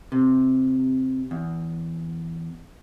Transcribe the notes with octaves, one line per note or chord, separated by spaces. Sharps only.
C3
E2